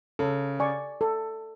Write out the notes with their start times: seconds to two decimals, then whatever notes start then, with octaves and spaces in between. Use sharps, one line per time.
0.19 C#3 A4
0.60 D5 G#5 C#6
1.01 A4